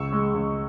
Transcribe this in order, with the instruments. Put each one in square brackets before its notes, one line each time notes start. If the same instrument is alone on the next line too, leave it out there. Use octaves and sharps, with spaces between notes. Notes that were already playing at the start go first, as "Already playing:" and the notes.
Already playing: [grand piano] C#2 C#6 E6
G#3
C#2